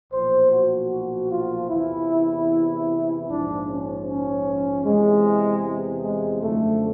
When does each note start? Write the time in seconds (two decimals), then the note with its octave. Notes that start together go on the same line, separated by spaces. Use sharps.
0.12 B1 A#2 F3 C5
0.51 F#4
0.90 F#4
1.30 F4
1.69 E2 C3 E3 E4
3.27 A#1 G#2 F3 D4
3.67 C#4
4.06 C#4
4.85 E2 C3 E3 G#3
6.03 G#3
6.42 F#2 D3 F3 A3